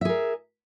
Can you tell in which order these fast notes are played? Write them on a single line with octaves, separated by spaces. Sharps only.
E5 G#4 A#4